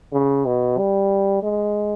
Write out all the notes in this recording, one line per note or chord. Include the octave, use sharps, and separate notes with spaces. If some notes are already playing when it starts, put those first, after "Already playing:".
C#3
B2
G3
G#3